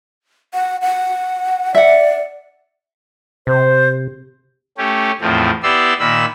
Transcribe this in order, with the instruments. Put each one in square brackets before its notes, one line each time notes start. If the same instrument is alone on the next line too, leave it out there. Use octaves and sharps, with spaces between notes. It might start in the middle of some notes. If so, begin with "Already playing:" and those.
[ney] F#5
F#5
[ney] D5 [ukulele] E5 F#5
[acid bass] C3 [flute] C5
[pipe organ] A3 C#4 G4
E2 A2 F3 C4
B3 E4 G4 D5 C6 E6
A#2 D#3 B5 E6